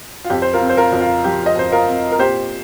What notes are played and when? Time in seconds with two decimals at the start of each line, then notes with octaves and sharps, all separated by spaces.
0.24 F4
0.30 F2 G4
0.42 C5
0.53 F4 A#4
0.61 C4
0.69 C5
0.77 F4 A#4
0.92 F2
1.00 F4
1.24 F3 G4
1.46 D#5
1.56 F2 C5
1.72 F4 A#4
1.88 C4
2.12 A#4
2.19 A#2 G4 C5